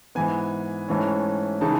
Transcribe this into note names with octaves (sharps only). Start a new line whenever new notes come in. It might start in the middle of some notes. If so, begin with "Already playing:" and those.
G#2 E3 B3 G#5
G#2 E3 A3 C#4
C#3 E3 G#3 D#4 A5